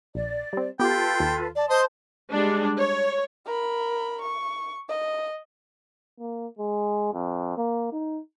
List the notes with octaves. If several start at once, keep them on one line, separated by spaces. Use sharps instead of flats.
A#1 D5
G3 C4
B3 F4 G4 A4 B4 G5
D#2
D5 A5
C5 D#5 C6 D#6
G3 G#3 D4
C#5
A#4 B5
C#6
D#5
A#3
G#3
F2
A#3
D#4